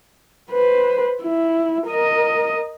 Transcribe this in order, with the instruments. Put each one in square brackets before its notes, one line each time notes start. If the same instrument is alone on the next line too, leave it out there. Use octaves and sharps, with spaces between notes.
[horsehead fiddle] B4 C5
E4
A#4 D#5